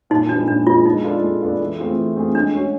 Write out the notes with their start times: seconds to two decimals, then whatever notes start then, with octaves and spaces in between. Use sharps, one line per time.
0.10 A#2 D#4
0.29 F3 G#3 B3 D4
0.48 A#2 D4
0.67 F3 G#3 B3 F4
0.86 G#3 D#4
1.04 B3 D4 F4 A4
1.22 G#3
1.41 B3 D4 F4 A4
1.60 E3
1.79 A3 C4 F4 G#4
1.98 E3
2.16 A3 C4 F4 G#4
2.35 G#3 D4
2.54 C#4 F#4